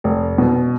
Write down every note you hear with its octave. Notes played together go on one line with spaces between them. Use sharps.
F1
B2